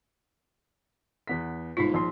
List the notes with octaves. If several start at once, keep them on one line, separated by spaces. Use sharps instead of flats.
E2 B3 B6
G1 G#2 D#4 F4 B6
A#1 C6